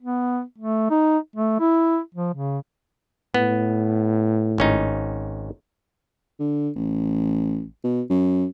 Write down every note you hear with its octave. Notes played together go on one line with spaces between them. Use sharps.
B3
A3
D#4
A3
E4
F3
C#3
A2 B3
G#1 C#4 D#4
D3
A1
B2
F#2